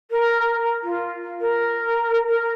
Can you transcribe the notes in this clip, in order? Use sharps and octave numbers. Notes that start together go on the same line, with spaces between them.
A#4
F4
A#4
A#4